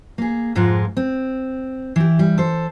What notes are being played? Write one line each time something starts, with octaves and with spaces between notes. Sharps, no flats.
A#3 G#4
F2 G#2 G#3 F4 A#4
C4
E3 G4
G3
A4 C5